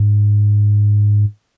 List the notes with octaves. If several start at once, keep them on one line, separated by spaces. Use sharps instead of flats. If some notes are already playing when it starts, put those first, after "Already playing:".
Already playing: G#2